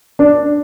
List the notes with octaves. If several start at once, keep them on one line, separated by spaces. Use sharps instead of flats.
D4